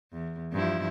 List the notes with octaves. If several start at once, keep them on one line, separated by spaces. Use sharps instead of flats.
E2
G2 F3 E4